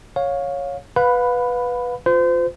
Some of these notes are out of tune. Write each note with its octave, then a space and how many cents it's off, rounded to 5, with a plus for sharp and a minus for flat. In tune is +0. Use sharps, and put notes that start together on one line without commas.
C#5 +0 F5 +20
B4 +0 F5 +40 B5 +10
F4 +15 C5 -35